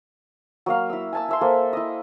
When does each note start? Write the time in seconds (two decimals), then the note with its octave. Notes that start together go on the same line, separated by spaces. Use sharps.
0.66 F#3 A#3 F5
0.90 E4 E6
1.13 G#5 A5 E6
1.28 E4 E5 C6
1.41 A#3 A4 C5
1.73 E4 D#5